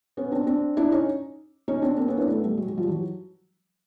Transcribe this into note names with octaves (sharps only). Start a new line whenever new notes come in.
B3 C#4
C4 D4
C4 D4
D4 E4
C#4 D#4
C#4 D#4
C4 D4
A#3 C4
B3 C#4
D4 E4
A3 B3
G3 A3
F#3 G#3
F#3 G#3
F3 G3
E3 F#3